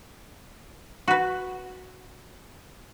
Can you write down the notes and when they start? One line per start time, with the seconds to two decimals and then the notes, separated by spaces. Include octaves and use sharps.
1.08 F#4 B4